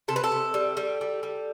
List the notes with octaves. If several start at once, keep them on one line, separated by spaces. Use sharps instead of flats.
C3 A4
B4
A4
C3
G3
G3
G3
G3